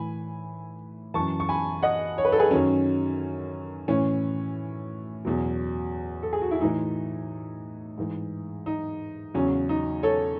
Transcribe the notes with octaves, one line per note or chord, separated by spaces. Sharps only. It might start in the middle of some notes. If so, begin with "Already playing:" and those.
Already playing: A2 E3 G#5 B5
F#2 E3 A5 C#6
C#6
G#5 B5
D#5 F#5
C#5
B4
A4
G#4 B4
F#2 D#3 F#3 C#4
A2 E3 C#4
E2 B2 F#3
A4
G#4
F#4
E4
A2 E3 D#4
G#2 E3
D#4
E2 C#3 F#3 C#4
D#4
A4 C#5